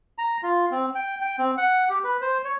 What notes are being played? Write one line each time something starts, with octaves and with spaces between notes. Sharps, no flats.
A#5
F4
C4
G5
G5
C4
F#5
G4
B4
C5
C#5